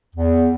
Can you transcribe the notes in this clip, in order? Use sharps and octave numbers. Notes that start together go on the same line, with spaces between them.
E2